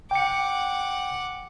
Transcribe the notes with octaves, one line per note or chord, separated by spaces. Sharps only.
F#5 G5 D6 C#7